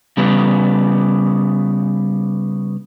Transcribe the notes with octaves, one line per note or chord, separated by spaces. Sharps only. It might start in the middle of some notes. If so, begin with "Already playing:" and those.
C#3 G3 B3